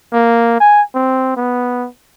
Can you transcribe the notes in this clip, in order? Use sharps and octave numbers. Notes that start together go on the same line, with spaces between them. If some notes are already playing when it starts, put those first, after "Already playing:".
A#3
G#5
C4
B3